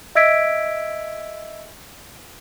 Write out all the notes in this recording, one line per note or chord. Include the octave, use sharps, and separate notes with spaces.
D#5 E5 E6 G#6 B6 D7